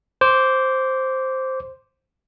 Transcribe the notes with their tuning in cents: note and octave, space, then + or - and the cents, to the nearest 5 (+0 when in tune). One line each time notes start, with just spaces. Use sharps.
C5 +0 D6 -20